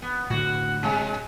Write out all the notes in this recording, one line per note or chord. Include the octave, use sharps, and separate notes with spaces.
B3
A2 D3 F#4
C3 G#3